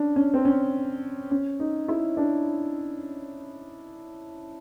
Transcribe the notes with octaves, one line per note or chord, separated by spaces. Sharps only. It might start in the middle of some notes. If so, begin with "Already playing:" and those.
Already playing: C#4 D4
C#4
C4
C#4
C#4
D#4
E4
D4